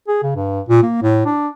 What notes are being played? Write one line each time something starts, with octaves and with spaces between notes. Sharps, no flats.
G#4
C#3
G2
A#2
A#3
A2
D4